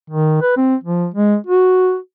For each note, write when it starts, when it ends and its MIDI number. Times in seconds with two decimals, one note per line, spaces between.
0.10 0.38 51
0.42 0.56 71
0.57 0.76 60
0.84 1.07 53
1.14 1.36 56
1.47 1.97 66